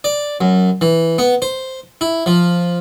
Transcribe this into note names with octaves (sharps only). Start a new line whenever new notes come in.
D5
F#2
E3
B3
C5
E4
F3